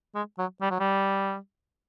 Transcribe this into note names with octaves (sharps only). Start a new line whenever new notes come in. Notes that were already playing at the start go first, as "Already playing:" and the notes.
G#3
F#3
G3
F#3
G3